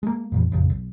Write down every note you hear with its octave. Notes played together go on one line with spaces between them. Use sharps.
G#3 A#3
F2 A#2 E3
A1 F2 C#3
B1